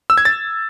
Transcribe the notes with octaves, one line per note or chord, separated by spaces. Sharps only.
E6
G#6
A6